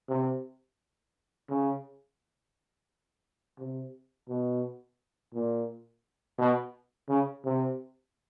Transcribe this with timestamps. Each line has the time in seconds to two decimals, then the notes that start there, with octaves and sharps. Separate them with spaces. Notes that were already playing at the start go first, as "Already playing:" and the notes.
0.09 C3
1.49 C#3
3.59 C3
4.29 B2
5.34 A#2
6.39 B2
7.09 C#3
7.45 C3